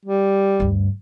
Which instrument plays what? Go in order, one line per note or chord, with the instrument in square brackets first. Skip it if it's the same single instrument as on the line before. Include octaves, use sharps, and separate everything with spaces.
[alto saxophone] G3
[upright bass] D2 G2